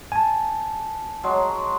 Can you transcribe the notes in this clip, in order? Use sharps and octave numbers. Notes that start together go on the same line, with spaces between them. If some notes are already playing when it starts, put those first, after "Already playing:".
G#5 A5
F#3 G#3